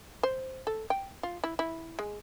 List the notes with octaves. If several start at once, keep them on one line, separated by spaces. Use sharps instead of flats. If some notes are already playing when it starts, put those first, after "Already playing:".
C5
A4
G5
F4
E4
E4
G#3